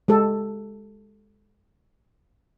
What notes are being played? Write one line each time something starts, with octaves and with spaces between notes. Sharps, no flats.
G#3 G4 A4